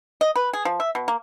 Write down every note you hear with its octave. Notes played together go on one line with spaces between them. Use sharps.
D#5
B4
G#4
F3
E5
B2
A#3